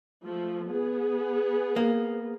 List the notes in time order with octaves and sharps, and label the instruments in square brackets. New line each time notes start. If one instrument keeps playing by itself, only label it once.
[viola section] F3 A3
B3 G#4
[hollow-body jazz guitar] A#3